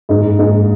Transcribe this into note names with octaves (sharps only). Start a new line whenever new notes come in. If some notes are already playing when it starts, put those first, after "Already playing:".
G#2 D#4
G#2 D#4